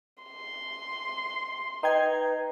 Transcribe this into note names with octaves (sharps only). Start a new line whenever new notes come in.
C6
D#4 B4 D#5 G5 G#6